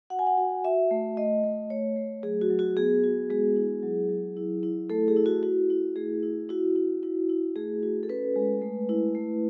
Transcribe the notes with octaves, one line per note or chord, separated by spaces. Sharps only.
F#4 F#5
G#5
F#5
F#4
F#4 E5
A3
A3 D#5
A3
A3 C#5
A3
F#3 G#4
F#4
F#3
F#4
B3 G#4
F#4
G#3 G#4
E4
F#3
F#3
E4
E4
A3 A4
G#4
E4
F#4
E4 F#4
E4
A3 G#4
E4
E4 F#4
E4
E4
E4
A3 G#4
F#4
A4
C#4 B4
G#3
A3
E4
A3